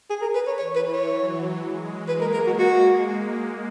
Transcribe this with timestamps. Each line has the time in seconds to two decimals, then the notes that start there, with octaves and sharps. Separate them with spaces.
0.10 G#4
0.22 A#4
0.35 B4
0.47 C#5
0.59 E3 C#5
0.76 B4
0.93 C#5
1.09 F#3
1.59 G#3
2.08 A#3 B4
2.21 A#4
2.34 A#4
2.47 F#4
2.59 F#4